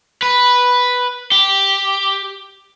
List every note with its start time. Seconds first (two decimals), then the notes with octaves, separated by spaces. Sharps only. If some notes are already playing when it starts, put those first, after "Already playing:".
0.22 B4
1.32 G4